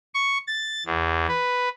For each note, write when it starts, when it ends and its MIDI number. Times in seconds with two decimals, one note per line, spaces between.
0.14 0.38 85
0.47 0.83 93
0.86 1.27 40
1.28 1.69 71